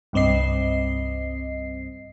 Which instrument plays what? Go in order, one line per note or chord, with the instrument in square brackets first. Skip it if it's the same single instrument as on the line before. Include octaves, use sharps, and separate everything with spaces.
[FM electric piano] C2 G2 C4 D#5 C7